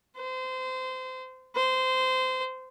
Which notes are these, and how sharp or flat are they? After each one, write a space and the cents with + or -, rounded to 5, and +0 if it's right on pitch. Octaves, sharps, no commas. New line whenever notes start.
C5 -25
C5 -20